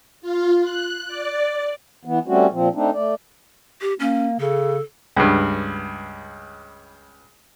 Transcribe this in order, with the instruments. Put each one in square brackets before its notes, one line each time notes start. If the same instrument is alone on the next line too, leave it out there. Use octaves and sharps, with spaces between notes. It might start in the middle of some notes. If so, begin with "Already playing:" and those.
[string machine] F4
F#6
D5
[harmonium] E3 B3
G3 A3 C4 C#4 F#4
A#2 F3 C4
A3 C4 D4 D#4
A3 D5
[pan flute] G4
[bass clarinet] A#3 [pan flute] C#4
[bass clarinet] C#3 [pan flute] A4
[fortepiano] C#2 G2